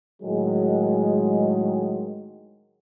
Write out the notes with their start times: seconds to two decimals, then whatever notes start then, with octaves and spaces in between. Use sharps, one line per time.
0.22 A2 D#3 F#3 G#3